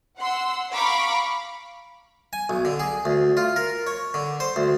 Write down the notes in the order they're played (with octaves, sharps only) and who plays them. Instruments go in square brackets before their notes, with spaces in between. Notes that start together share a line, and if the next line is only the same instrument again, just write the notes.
[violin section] F#5 C6 E6
F5 A#5 B5 C#6 D6
[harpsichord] G#5
B1
D3
G#4
D2
F4
A#4
C#5
D3
C5
D2